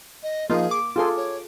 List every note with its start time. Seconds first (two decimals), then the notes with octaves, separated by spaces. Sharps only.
0.23 D#5
0.50 F3 A#3 D#4 F4 G#4
0.71 D6
0.96 F4 G#4 A4 C6
1.17 C#5